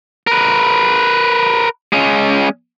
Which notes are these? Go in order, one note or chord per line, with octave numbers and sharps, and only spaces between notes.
A#4 B4
G#3 C#4